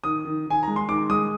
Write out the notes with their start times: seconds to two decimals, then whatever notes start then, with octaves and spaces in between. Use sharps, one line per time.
0.04 D#3 D#6
0.25 D#3
0.46 D#3 G#5
0.63 G#3 A#5
0.76 C6
0.88 D#3 D6
1.10 G#3 D#6